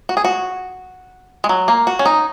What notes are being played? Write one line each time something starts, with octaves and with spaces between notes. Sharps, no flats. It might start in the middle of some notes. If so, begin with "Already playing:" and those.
F#4
G#4
F#4
G#3
F#3
A#3
F#4
C#4
D#4